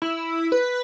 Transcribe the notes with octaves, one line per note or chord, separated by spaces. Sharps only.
E4
B4